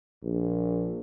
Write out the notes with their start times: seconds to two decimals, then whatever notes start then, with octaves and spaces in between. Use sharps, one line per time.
0.23 A#1